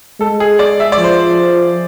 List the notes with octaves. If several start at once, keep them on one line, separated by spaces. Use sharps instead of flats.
G#3 A4
G#4
D5
E5
D5
F3
C5